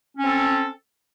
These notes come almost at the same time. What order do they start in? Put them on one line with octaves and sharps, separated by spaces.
C#4 C4 A4